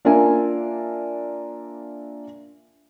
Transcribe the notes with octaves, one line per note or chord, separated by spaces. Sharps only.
A#3 D4 F4 A#4 E5 G#5